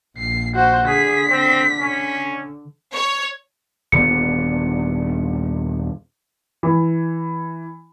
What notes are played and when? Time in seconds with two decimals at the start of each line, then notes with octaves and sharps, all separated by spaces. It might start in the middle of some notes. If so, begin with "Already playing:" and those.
0.18 A#1 C7
0.55 F#4 C5
0.87 D3 G#4 B6
1.30 C4
1.80 C#4
2.94 C#5
3.92 D#1 D3 B3 C#7
6.63 E3